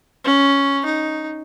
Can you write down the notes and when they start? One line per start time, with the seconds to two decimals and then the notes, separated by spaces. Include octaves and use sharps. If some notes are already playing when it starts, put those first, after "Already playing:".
0.24 C#4
0.85 D#4